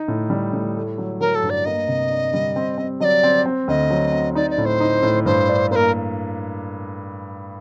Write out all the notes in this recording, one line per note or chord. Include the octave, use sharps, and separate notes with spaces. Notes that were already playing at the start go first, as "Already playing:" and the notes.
Already playing: D#4
A2
G3
A2
A3
F#3
F#3 A#4
A4
G2
D5
A#3 D#5
C3
D4
G3
C4
C4
F#3 D5 D#5
C4
C4
D2 D#5
F#3
C4
D#4 D5
D5
A2
C5
D#4
A2
G2 C5
D4
A#3 A#4 C5